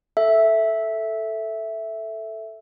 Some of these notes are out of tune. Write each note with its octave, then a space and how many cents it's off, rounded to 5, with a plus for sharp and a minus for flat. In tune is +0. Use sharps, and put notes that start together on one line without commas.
A4 +0 E5 +0